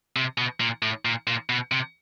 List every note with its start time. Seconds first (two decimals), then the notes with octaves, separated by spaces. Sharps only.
0.16 C3
0.38 B2
0.61 A#2
0.82 A2
1.05 A#2
1.27 A#2
1.50 B2
1.72 C3